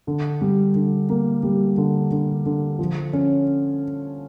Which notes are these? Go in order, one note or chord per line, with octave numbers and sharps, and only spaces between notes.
D3
G3
D3
A#3
G3
D3
D3
D3
F3
C#4